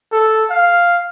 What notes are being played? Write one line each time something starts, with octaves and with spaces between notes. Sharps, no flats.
A4
F5